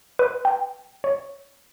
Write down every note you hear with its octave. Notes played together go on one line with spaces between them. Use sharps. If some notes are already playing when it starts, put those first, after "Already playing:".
B4
G5
C#5